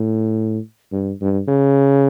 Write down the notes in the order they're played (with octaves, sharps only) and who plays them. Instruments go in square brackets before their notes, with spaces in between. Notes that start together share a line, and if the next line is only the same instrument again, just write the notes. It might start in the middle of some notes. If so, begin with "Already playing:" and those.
Already playing: [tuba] A2
G2
G2
C#3